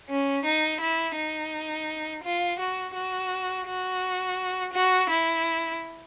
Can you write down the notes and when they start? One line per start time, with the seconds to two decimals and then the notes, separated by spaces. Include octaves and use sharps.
0.09 C#4
0.45 D#4
0.81 E4
1.17 D#4
2.24 F4
2.59 F#4
2.95 F#4
3.67 F#4
4.73 F#4
5.10 E4